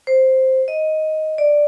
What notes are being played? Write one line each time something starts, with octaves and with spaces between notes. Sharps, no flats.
C5
D#5
D5